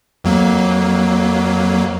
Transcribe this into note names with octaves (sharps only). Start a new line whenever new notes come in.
F2 F#3 A#3